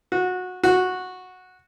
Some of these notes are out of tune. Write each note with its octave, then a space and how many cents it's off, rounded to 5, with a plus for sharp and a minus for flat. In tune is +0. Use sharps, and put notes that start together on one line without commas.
F#4 -20
F#4 -10